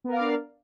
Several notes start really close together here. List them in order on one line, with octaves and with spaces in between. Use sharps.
B3 A#4 F5 D5 D4